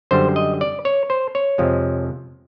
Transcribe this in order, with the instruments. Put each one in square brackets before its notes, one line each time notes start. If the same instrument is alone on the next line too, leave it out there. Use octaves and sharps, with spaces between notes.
[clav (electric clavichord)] F#2 D3 G3 C5
D#5
D5
C#5
C5
C#5
F2 C3 F3 G#3